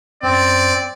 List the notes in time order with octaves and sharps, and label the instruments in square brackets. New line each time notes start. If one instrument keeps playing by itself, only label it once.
[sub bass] F#2 [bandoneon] C4 [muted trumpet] D5